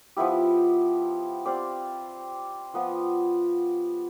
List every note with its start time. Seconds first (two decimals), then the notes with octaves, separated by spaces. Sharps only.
0.17 F3 B3 E4 G4
1.45 C4 G4 D5 F5
2.74 F3 B3 F4 B4